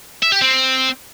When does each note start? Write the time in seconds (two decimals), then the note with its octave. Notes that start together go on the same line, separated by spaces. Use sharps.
0.22 E5
0.32 G4
0.41 C4